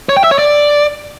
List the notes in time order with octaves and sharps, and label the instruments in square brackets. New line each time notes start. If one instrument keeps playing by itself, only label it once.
[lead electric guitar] C#5
G5
E5
C#5
D5